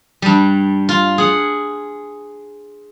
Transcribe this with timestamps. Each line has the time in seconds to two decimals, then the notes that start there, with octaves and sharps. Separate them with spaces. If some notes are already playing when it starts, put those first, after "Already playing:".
0.22 G2 G3
0.89 F4
1.18 G#4 F#5